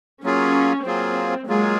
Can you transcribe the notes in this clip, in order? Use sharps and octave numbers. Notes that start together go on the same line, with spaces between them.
F#3 A#3 C#4 F4 G#4
F#3 A#3 C4 F4 G#4
F#3 G#3 A#3 F4 G#4